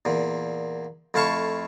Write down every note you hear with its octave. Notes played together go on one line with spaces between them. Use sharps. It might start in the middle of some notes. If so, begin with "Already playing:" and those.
E2 A#2
F2 A3 E4 F5 A5 C#6